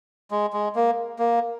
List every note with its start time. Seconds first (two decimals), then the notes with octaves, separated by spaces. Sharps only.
0.31 G#3
0.53 G#3
0.75 A#3
1.19 A#3